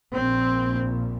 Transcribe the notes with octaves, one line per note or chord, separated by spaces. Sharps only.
A#1 A#2 C4